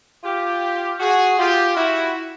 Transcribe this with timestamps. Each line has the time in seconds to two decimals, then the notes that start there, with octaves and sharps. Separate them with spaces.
0.24 F4 G4
1.00 F#4 G#4
1.39 F4 G4
1.77 E4 F#4